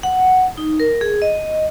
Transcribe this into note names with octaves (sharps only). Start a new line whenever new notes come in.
F#5
D#4
A#4
G#4
D#5